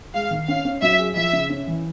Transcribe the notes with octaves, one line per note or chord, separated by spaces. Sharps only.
G#3 F5
D#3
C#4 F5
C#4
F#3 E5
G#4
F3 E5
C#3
C#4
E3